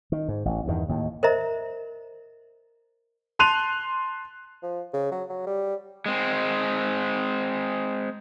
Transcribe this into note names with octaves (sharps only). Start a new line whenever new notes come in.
D#3
G#2
A1
E2 G2 D#3
D#2 A2
A#4 C5 D#5 E5 A#5
A5 C6 F#6 D#7 F7
F3
C#3
F#3
F#3
G3
G#3 C4